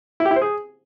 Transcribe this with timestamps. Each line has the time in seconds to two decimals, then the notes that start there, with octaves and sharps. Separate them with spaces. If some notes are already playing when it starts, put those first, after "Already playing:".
0.20 E4
0.25 G4
0.31 E4
0.36 C5
0.42 G#4